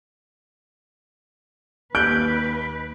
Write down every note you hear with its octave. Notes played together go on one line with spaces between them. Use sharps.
D#2 B4 F#6 G6 D7